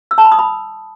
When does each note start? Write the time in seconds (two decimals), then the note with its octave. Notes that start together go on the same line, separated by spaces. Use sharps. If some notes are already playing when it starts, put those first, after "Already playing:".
0.11 E6
0.18 A5
0.25 B5
0.32 D#6
0.39 B5